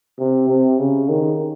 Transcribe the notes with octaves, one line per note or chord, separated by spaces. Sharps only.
C3
C3
C#3
D#3